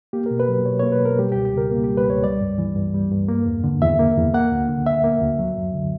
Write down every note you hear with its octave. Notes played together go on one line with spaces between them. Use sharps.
A#3 G4
A#4
B2
B4
F#3
B2 C#5
A#3 C#5
B4
B2 A#4
G3 G4
C#2 G4
G4
C#3 A#4
A#3
G4
G3
B4
C#2 C#5
G3 D5
G2
E3
G2
G3
G2
A#3
E2
D3
E2 E5
A#3
E2
A#3 F#5
D2
D3
D2 E5
A#3
D2
F#3
F#2
D3